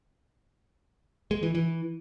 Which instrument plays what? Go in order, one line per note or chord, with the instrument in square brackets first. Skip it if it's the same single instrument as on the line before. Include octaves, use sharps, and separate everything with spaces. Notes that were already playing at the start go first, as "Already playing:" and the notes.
[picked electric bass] G#3
E3
E3